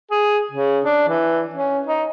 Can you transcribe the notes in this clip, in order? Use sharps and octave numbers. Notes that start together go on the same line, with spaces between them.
G#4
C#3
D4
E3
C#4
D#4